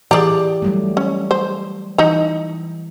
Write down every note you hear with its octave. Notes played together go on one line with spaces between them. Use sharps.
E3 G4 G#4 D5 A#5
F#3 G3 A3
C#4
C5
E3 D#4 A#5